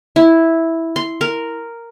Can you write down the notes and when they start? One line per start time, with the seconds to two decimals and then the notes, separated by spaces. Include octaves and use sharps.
0.16 E4
0.96 C6
1.21 A#4